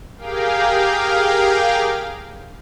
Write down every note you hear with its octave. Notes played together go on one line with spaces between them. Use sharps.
G4 G#4 A#4 F5 G5